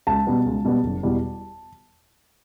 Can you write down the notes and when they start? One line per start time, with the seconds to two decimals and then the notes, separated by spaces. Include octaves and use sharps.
0.07 C#2 A5
0.27 B2 G3 B3
0.46 C#2
0.65 B2 G3 B3
0.84 F#1
1.03 E2 B2 G3